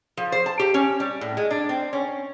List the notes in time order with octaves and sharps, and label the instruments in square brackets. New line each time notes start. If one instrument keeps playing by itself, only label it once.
[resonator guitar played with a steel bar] F3
C5
A5
G4
C#4
G3
A2
G#3
D4
C4
C#4